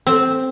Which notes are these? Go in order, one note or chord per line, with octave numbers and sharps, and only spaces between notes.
C4